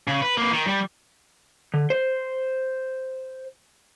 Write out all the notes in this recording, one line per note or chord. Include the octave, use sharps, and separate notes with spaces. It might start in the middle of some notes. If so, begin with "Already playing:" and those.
C#3
B4
A#3 B4
D#3
G3
D3
C5